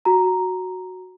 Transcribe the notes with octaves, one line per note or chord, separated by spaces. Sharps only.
F#4 A#5